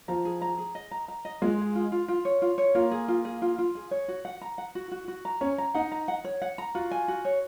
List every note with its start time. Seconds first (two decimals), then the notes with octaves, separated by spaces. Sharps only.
0.08 F3 A#5
0.25 G#4
0.42 A#5
0.58 G#4
0.75 D#5
0.91 A#5
1.08 A#5
1.25 D#5
1.42 G#3 F4
1.59 G#4
1.75 F4
1.92 F4
2.08 F4
2.25 C#5
2.42 F4
2.58 C#5
2.75 A#3 F4
2.91 G#4
3.08 F4
3.25 G#4
3.42 F4
3.58 F4
3.75 G#4
3.91 C#5
4.08 F#4
4.25 F#5
4.41 A#5
4.58 F#5
4.75 F#4
4.92 F#4
5.08 F#4
5.25 A#5
5.41 C#4 C#5
5.58 A#5
5.74 D#4 F#5
5.92 A#5
6.08 F#5
6.24 C#5
6.42 F#5
6.58 A#5
6.75 F4 F#4
6.91 G#5
7.08 F#4
7.25 C#5